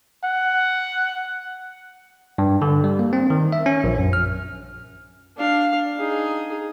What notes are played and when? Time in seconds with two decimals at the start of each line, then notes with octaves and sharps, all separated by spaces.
0.24 F#5
2.38 G2
2.62 D3
2.84 G3
2.99 A#3
3.13 C4
3.30 D#3
3.52 E5
3.66 C#4
3.84 A#1
3.99 F#2
4.13 F6
5.37 D4 F5
5.98 D#4 G#4